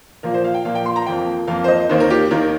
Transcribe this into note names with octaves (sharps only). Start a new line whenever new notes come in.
A#2 F3 A#3 A#4
C5
F5
G5
A#2 F3 A#3 F5
G5
C6
A#5
F2 F3 A#3 G5
F2 F3 A#3 F5
C5
D#5
D#2 D#3 A#3 C5
A#4
G4
D#2 D#3 A#3 A#4